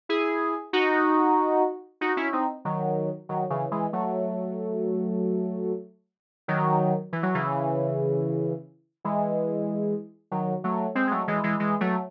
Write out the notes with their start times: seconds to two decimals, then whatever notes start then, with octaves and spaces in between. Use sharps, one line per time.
0.09 E4 G#4
0.73 D#4 F#4
2.01 D#4 F#4
2.17 C#4 E4
2.33 C4 D#4
2.65 D#3 F#3
3.29 D#3 F#3
3.50 C#3 E3
3.71 E3 G#3
3.93 F#3 A3
6.48 D#3 F#3
7.13 E3
7.23 F#3
7.34 C#3 E3
9.05 E3 G#3
10.31 D#3 F#3
10.64 F#3 A3
10.95 G#3 C4
11.07 G#3
11.11 F#3 A3
11.28 E3 G#3
11.44 E3 G#3
11.60 E3 G#3
11.81 F#3 A3